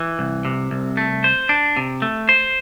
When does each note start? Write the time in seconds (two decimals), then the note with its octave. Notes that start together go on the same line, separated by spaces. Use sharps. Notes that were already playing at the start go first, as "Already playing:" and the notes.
Already playing: E3
0.19 C2
0.45 C3
0.71 C2
0.97 A3
1.24 C5
1.49 D4
1.77 C3
2.02 A3
2.29 C5